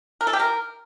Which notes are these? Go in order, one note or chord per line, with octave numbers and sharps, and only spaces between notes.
A#4
A4
G4
A#4